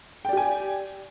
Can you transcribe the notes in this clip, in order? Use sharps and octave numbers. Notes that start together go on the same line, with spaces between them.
G4 D5 G5 G#5